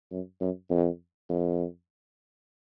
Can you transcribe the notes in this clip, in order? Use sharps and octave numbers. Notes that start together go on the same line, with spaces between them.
F#2
F#2
F2
F2